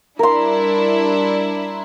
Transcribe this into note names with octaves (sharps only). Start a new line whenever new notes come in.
G3 D4 E4 A#4 C6